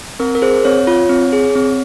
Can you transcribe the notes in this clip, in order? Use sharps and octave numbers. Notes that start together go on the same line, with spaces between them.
C4 A#4
A#4
G#4 C5
C4 C#5
F4
C4
G#4
C4